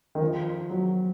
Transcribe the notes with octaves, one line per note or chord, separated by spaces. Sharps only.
D#3
F3
F#3